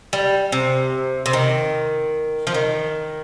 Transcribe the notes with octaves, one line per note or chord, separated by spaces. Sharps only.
G3
C3
C3
D#3
F3
D#3